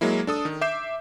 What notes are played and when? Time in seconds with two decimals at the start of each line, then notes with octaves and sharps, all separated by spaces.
0.01 F#3 G#3 A#3 E4
0.27 D4 A4 D#6
0.45 D#3
0.61 E5 D6 G6 C7 E7